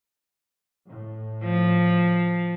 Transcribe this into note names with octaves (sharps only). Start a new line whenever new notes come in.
A2
F3